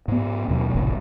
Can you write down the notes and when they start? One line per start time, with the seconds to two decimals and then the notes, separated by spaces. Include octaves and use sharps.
0.08 G#2 B3
0.48 D#2 B2 F#3
0.75 F1 B1 G#2 D3